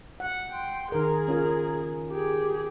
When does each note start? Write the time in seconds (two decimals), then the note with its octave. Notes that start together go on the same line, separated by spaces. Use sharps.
0.20 F#5
0.52 G5 C6
0.92 D#3 G#4 A#4
1.28 C#4 F4 A#4
2.11 G4 G#4